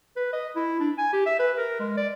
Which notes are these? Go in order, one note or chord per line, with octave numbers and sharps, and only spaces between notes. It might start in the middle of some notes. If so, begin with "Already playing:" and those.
B4
D#5
E4
D4
G#5
G4
E5
B4
A#4
G#3
D5